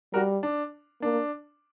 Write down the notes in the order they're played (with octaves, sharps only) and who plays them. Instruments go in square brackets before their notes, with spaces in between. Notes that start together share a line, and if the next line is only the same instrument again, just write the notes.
[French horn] G3 [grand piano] F#4 A#4
[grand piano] D4
[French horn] A#3 [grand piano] D4